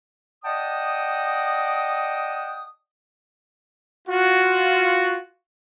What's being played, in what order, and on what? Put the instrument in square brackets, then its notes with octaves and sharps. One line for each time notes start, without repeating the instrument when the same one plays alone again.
[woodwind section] D5 D#5 F#5 G5 A5 D#6
[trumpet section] F4 F#4